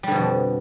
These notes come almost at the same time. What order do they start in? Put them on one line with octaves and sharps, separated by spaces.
G3 D3 B2 F2